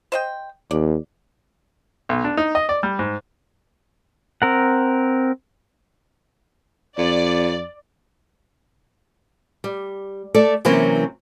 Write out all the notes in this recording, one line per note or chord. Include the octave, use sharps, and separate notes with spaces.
C5 D#5 G5
D#2 D5
B1
D4
D#4
D#5
D5
G3
G#2
C4 A#4 F#5
F2 D5
G3
A3 A4 D5
C3 E3 F#3 A#3 C4 C#4